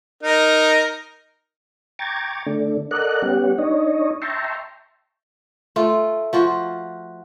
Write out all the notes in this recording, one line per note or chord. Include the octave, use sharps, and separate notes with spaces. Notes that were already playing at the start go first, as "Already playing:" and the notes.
D#4 A#4
G5 A#5 C#6 D6 G#6 A6
D3 A3 D4
A4 A#4 D5 D#5 F#5 F#6
G3 B3 C#4 G4 F#5
D4 D#4 C#5 D#5
E5 G5 A5 A#5 C6 C#6
A3 F4
F3 F4 F#4